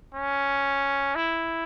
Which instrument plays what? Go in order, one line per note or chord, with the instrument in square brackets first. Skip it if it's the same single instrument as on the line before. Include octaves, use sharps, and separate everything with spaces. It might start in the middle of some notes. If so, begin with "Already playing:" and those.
[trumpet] C#4
E4